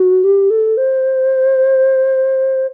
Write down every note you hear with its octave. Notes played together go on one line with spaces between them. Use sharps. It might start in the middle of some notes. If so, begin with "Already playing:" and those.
Already playing: F#4
G4
A4
C5